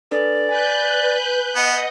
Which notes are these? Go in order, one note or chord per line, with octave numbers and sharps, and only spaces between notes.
D4 A4 B4 D5
B4 G#5 F#6 G6
B3 D#5 F#5